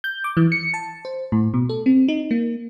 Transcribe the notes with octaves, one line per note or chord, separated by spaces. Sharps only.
G6
D6
E3
C#7
A5
C5
A2
B2
A4
C4
D#4
A#3